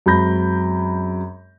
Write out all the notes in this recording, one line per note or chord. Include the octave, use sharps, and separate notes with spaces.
F#2 G#3 C4 B5 G6 A#6